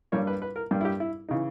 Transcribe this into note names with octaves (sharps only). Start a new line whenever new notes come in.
G2 G3 A#3 C#5
B4
B4
A#4
G2 G3 A#3
E4
G4
E4
C#3 E3 D#4